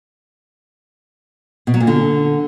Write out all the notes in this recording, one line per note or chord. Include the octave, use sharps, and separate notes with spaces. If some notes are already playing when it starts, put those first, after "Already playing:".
B2
F#3
A#2
D3